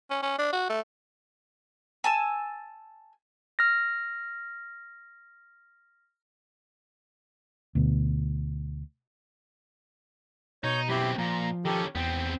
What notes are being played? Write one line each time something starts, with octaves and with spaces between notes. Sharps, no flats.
C#4
C#4
D4
F#4
A3
G#5 A5 E6
F6 A#6
D2 B2
B2 D#4 C#5 G6
F#2 C4 E4 G4 B5
A#2 F3 A#5
D#3 C#4 G4 A4
E2 B3 C4 G5